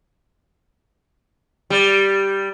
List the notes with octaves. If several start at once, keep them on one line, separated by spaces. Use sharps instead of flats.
G3